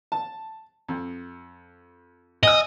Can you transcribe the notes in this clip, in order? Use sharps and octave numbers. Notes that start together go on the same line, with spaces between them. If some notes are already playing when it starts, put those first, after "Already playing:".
A5
F2
D#5 G#5 E6